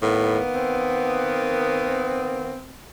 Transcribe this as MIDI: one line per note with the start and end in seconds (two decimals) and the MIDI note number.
0.02 0.39 45
0.02 2.55 51
0.02 2.55 58
0.02 2.55 59
0.55 2.75 60